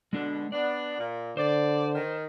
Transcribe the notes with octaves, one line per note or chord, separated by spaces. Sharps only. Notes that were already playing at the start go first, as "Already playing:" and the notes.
B2 D3 G#3 D4
B3 D4 D5
A#2
D3 C5 D5
D#3